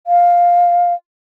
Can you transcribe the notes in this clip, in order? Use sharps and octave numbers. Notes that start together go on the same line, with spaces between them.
F5